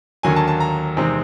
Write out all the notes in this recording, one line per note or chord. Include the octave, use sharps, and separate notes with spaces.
D#2 D3 F#3 A#3 G#5
A5
A5
A#5
E2 C3 D#3 G#3 C4